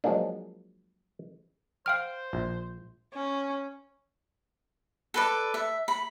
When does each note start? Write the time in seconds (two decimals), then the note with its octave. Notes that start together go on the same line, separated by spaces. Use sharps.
0.04 F3 F#3 G#3 A#3 D4
1.86 C5 F5 G5 F6
2.33 A#1
3.14 C#4
5.14 A4 B4 D5
5.54 E5
5.88 B5